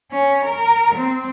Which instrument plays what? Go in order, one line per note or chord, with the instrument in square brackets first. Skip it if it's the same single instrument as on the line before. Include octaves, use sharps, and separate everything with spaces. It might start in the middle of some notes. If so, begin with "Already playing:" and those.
[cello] C#4
A#4
C4